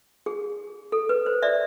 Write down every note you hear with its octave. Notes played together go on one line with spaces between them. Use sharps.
G#4
A4
B4
C5
D5 E5